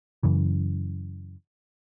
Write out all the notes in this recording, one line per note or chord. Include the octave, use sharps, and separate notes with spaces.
F#2 C#3 E3